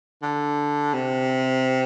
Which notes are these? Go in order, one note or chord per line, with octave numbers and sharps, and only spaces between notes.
D3
C3